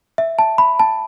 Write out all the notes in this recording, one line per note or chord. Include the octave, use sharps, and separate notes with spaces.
E5
A5
B5
A5